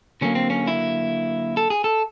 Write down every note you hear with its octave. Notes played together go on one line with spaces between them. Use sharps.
D3 F#3 A#3 C#4
C4
C#4
E4
A4
G#4
A4